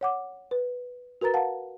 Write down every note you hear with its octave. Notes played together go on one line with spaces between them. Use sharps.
C#5 F#5 D6
B4
F#4 A#4 B4 A#5 A6
F5 F#5 A5